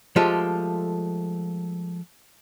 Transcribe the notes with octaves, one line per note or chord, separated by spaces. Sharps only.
F3 G#3 A3 F4 G4 A4